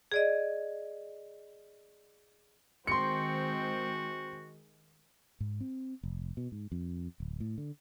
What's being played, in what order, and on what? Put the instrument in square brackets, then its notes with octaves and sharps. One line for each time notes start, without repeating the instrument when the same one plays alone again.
[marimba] G#4 D5 D#5
[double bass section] D#3 G#3 [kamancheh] C4 C5 [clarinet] F#4 [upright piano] C6 C#7
[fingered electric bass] G#2
C4
F1
B2
G#2
F2
D1
A2
D3